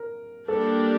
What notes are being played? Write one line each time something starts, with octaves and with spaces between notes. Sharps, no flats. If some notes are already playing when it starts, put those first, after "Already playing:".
Already playing: A#4
G3 A#3 D4 G4 A4